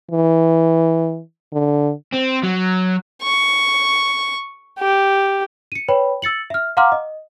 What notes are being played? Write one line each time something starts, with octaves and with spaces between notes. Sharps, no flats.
E3
D3
C4
F#3
C#6
G4
C#7 D#7
B4 C#5 G5 B5
E6 A6 C#7 F#7
E5 F6
F5 F#5 A#5 C6 D6 F6
D#5